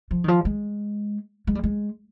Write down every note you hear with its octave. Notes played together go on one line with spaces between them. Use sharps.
F3
D#3
F3
G#3
G#3
G3
G#3